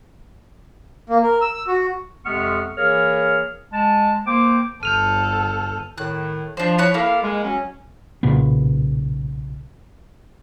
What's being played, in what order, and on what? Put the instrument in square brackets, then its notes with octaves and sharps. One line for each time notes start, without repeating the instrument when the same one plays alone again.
[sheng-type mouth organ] A#3
A#4
E6
F#4
[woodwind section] F2 C3 G#3 B3 C#6 F6
E3 A#3 G#4 A#4 C#5 F6
G#3 A5
A#3 C5 G5 D6
[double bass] G1 [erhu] A4 [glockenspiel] F6 G6 [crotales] D#7 F7
[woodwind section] A2 D#3 [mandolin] F#6
[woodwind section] F3 [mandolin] D4 C5
[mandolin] E4 C#5 F#5
[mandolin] A#3 E4 [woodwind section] A4 F5
[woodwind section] G#3
F#3 C#4
[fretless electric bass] B1 A#2 C#3 B3